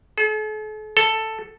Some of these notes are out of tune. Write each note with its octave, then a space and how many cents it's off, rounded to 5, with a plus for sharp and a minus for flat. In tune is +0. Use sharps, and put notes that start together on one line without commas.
A4 -45
A4 +5